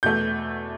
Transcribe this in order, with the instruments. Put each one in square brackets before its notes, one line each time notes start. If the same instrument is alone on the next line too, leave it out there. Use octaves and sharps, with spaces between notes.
[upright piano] E2 B2 A3 G6